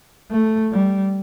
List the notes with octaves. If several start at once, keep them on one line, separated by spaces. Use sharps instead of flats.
A3
G3